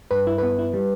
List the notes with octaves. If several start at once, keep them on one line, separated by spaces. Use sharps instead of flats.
G2 B4
E4
B3 B4
E4
G3